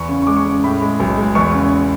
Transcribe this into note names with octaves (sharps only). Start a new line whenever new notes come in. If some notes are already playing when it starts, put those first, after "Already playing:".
Already playing: E2 C#6
C#3
C#6
G#3 D6
C#6
C#3
A2 B5
G#3
B1
G#3
E2 C#6
C#3